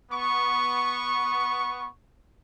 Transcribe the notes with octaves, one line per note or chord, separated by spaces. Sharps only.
B3 C#6